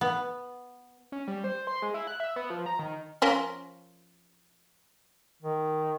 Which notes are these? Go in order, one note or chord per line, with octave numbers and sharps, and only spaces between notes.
B3
C#4
G3
C5
C6
G#3
E4
F#6
E5
B3
F3
A#5
D#3
F3 C#4 A#4
D#3